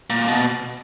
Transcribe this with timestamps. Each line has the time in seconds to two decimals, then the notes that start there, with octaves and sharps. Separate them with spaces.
0.10 A#2
0.28 B2